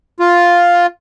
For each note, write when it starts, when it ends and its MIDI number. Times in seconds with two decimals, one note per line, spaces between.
0.20 0.86 65